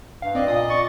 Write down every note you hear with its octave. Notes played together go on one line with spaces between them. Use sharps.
G2 F5
C4 D5 D#5
A#2 D#6
C#6 A6